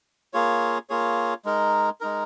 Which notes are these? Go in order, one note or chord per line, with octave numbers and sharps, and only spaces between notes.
A#3 F4 G#4 C#5
A#3 F4 G#4 C#5
G#3 D#4 A#4
G#3 D#4 A#4